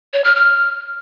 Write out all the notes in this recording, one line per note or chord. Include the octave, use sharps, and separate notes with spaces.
C#5
F6
F6